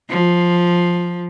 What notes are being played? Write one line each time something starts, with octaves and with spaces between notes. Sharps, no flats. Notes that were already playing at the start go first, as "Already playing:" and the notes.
F3